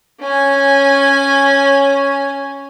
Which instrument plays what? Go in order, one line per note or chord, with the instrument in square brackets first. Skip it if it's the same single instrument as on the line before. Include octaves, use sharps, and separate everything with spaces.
[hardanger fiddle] C#4 G#5